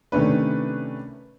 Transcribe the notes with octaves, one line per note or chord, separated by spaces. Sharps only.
C3 D#3 A3 C#4 D4 B4